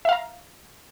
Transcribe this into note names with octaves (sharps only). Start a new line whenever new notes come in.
E5 F5 A#5